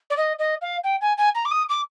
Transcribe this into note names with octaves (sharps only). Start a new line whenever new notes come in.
D5
D#5
D#5
F5
G5
G#5
G#5
A#5
D6
D#6
D6